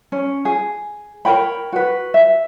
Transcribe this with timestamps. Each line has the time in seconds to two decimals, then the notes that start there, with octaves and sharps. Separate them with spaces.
0.12 C#4
0.45 G#4
1.25 A#4 C#5 G5 B5
1.72 F#4 B4
2.14 E5